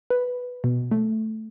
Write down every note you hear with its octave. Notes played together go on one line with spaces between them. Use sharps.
B4
B2
A3